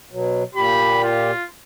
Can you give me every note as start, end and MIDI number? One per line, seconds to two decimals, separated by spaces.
0.12 0.43 47
0.12 0.43 54
0.55 1.31 46
0.55 1.31 67
0.55 1.00 83
1.03 1.46 65